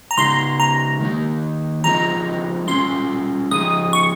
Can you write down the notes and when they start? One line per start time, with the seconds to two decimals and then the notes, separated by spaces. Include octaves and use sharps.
0.11 A#5
0.18 C#3 G#3 D#4 C6
0.60 A#5
1.01 D#3 A#3 D#4
1.84 F3 G#3 C4 D#4 A#5
2.67 G3 C#4 F4 C6
3.51 F3 G#3 D#4 D#6
3.93 C#6